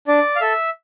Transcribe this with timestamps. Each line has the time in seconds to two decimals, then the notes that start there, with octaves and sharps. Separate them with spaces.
0.08 D4 D5
0.36 F5
0.40 A4 E5